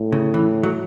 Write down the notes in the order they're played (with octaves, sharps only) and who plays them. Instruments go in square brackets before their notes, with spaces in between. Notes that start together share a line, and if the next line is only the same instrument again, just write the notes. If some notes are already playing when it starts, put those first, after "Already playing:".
Already playing: [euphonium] A2
[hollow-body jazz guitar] C#3
E3
F#3